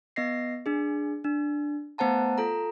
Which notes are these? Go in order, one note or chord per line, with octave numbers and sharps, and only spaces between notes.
B3 D#5 A#6 C7
D4 G#4
D4
A3 B3 C5 F#5 A5 A#5
F4 A4 A#5